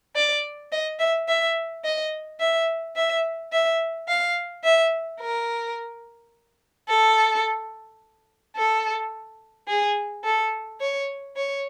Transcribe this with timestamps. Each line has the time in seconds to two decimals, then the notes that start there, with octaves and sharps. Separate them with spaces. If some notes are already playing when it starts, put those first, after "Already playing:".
0.16 D5
0.72 D#5
1.00 E5
1.28 E5
1.84 D#5
2.40 E5
2.96 E5
3.52 E5
4.08 F5
4.64 E5
5.21 A#4
6.89 A4
8.56 A4
9.68 G#4
10.24 A4
10.81 C#5
11.37 C#5